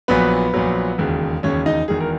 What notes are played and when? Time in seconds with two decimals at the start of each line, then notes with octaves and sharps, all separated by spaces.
0.08 A#1 A#2 F#3 B3 B4
0.54 A#1 A#2 F#3
0.98 E1 D#2 C#3
1.43 E1 D#2 C#3 C#4 C#5
1.66 D#4 D#5
1.88 E1 E2 D#3 G#4
2.00 A#4